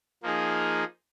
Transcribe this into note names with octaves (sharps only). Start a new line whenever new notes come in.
F3 A#3 D#4 G#4